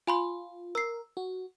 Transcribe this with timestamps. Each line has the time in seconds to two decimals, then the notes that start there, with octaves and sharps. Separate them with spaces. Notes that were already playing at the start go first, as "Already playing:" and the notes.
0.07 F4 G#5 B5 C6
0.75 A#4 E6 C7
1.17 F#4